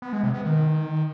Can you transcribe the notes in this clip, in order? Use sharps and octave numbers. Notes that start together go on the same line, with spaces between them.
B3
G#3
C3
B3
D#3